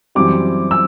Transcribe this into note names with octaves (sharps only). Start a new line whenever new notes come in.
F#2 E3 G3 C4 D6
E6